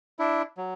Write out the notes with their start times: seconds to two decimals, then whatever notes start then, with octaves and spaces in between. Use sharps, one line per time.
0.19 D4 E4
0.58 F#3